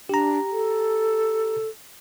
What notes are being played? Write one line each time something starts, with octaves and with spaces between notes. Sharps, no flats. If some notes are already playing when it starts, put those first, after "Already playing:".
D4 G4 A#5
A4